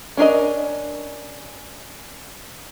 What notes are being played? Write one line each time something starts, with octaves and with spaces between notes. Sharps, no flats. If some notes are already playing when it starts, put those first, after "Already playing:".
C#4 D4 A#4 D#5